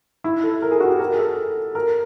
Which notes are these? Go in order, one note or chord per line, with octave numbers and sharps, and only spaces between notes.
E4
A4
A#4
G#4
F#4
G4
A#4
G#4
A4
A#4